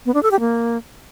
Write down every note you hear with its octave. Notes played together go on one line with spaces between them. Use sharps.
B3
D4
A4
G4
A#3